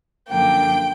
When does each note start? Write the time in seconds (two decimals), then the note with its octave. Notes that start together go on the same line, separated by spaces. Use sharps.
0.29 F#2 D3 F3 A#3 G5